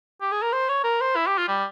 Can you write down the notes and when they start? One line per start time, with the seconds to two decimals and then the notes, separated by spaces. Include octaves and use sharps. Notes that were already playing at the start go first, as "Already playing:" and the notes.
0.21 G4
0.32 G#4
0.42 A#4
0.52 C5
0.69 C#5
0.84 A#4
1.01 C5
1.16 E4
1.27 G4
1.38 F4
1.48 G3